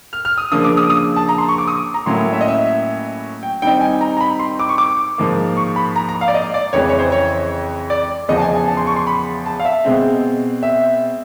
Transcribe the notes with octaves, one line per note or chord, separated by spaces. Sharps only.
F6
F6
D#6
C#3 F3 A#3 D4 D#6
D6
D#6
D#6
A5
A#5
C6
C#6
D6
D#6
A#5
A2 F#3 A#3 C#4 E4 C6
E5
D#5
E5
G5
D#3 G3 C4 D#4 G5
G#5
A#5
A#5
B5
C6
D6
C#6
D6
G#2 F3 A#3
C#6
B5
A#5
A#5
F5
D5
D#5
D5
F2 C#3 E3 G#3 C#5
C#5
C5
C#5
D5
E2 C#3 F3 D#5
A5
G#5
G#5
A5
C6
C#6
C6
B5
A5
F5
E5
B2 G#3 C4
E5